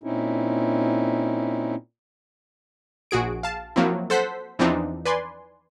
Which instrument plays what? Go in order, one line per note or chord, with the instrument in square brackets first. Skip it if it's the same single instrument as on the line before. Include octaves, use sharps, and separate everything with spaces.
[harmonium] A#2 C4 C#4 D#4 E4
[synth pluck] A#1 F#4 G#4 D7
F5 A5
F3 F#3 A#3 C4 E4
A4 C5 F#5 B6
E2 E3 F3 C4 D4 D#4
B4 D5 G#5 C6